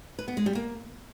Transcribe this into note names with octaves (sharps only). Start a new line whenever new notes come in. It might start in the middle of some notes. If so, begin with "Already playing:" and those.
B4
B3
G#3
G3
A#3